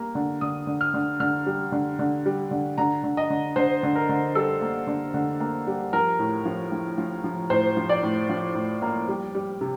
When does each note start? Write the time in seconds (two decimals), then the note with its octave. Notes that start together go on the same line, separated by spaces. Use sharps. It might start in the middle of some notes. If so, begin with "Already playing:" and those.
Already playing: G3 A#3
0.15 D3
0.41 D3 D#6
0.67 D3
0.81 F6
0.94 D3
1.20 D3 F6
1.46 G3
1.72 D3
1.99 D3
2.26 G3
2.51 D3
2.78 D3 A#5
3.04 D3
3.17 D#5
3.30 D3
3.56 D3 C5
3.83 D3
3.95 A#4
4.09 D3
4.35 G3 A4
4.62 A#3
4.87 D3
5.14 D3
5.40 A#3
5.67 G3
5.93 F3 A#4
6.19 A2
6.45 F3
6.72 F3
6.98 F3
7.24 F3
7.50 A2 C5
7.77 F3
7.89 D5
8.03 A2
8.29 F3
8.55 A2
8.82 A#3
9.08 G3
9.35 G3
9.61 C3